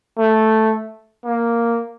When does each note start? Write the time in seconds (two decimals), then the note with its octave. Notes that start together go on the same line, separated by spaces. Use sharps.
0.18 A3
1.25 A#3